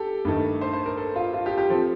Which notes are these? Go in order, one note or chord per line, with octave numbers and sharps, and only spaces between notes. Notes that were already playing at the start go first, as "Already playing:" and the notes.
Already playing: G4 A4
G2 D#3 A3
C5
C5
A#4
A4
F4
F4
G4
G4
F3 C4 A4